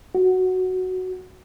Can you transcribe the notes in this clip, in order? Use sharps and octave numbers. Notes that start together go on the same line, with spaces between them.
F#4